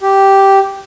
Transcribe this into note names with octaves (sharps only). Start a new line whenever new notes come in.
G4